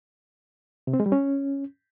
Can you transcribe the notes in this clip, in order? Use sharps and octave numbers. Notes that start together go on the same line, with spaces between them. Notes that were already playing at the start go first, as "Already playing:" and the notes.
C3
C4
G#3
G3
C#4